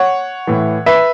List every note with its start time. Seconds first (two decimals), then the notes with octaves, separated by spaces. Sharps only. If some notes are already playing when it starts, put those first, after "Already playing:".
Already playing: C#5 F#5
0.47 A2 E3
0.86 B4 E5